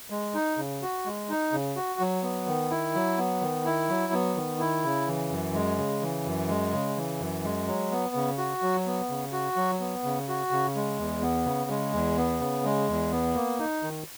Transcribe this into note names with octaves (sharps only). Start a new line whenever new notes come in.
G#3
D#4
C#3
F#4
G#3
D#4
C#3
F#4
F#3
B3
D#3
E4
F#3
B3
D#3
E4
F#3
B3
D#3
E4
C#3
E3
F#2
G#3
C#3
E3
F#2
G#3
C#3
E3
F#2
G#3
F#3
B3
C#3
F#4
F#3
B3
C#3
F#4
F#3
B3
C#3
F#4
C#3
G#3
E2
B3
C#3
G#3
E2
B3
C#3
G#3
E2
B3
A#3
D#4
D#3